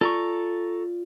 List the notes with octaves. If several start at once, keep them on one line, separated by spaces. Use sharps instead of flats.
F4 A4 D5 A#5 C#6